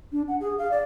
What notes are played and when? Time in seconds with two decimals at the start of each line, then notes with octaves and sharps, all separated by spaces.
0.12 D4
0.28 F#5
0.41 G#4
0.58 F5
0.71 D5